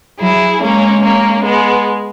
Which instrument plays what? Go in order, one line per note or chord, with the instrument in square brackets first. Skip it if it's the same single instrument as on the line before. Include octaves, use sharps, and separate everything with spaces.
[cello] F#3 [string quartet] E4 G#4
[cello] G#3 [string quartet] A#3 C#4
[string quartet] A#3 C#4
G#3 B3